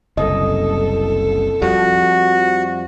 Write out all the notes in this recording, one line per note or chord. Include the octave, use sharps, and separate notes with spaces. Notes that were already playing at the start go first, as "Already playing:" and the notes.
F#1 C2 A4 D#5
F2 F3 G3 F#4